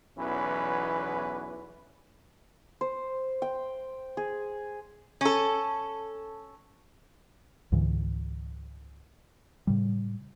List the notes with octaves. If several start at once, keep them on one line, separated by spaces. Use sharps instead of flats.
B1 E2 E3 C#4 B4
C5
G5
G#4
C#4 A4
C#2 G#2 D3 E3
A2 C#3 G3